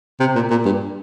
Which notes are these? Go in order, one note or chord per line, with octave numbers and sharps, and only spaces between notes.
C3
A#2
A#2
G2